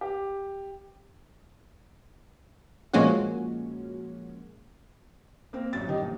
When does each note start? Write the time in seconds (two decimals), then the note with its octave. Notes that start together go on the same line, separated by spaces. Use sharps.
0.01 G4
2.93 A#2 F3 G#3 A#3 C#4 F#4
5.53 A#3 C4 A#4
5.73 A1 F#2 A6
5.88 D#3 G3 D#4 G4
6.02 A#1